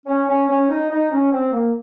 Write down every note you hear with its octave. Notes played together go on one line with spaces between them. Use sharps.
C#4
C#4
C#4
D#4
D#4
C#4
C4
A#3